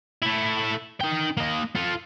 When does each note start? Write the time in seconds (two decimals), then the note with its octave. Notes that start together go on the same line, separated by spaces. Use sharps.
0.22 A3 E4
1.01 D#4 G5
1.37 A#3 D#5
1.75 F4 A4